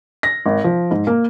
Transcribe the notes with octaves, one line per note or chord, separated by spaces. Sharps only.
A#6
G#1
F3
G#2
A#3